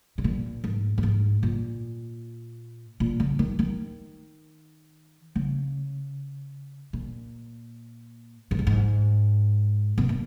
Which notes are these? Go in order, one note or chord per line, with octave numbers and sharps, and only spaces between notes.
B2
A#2
G#2
F#2
G#2
A#2
A#2
C#3
D#3
D#3
C#3
A#2
G#2
A#2
G#2
B2
A#2